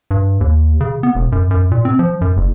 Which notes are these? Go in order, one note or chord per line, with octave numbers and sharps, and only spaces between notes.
G2
D#2
C#3
B3
E1
F#2
F#2
A#2
C4
F3
F#2
F#1